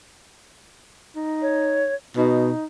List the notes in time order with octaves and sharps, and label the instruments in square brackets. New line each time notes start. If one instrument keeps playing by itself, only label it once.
[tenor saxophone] D#4
[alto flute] C#5
[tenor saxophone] B2 [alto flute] D#4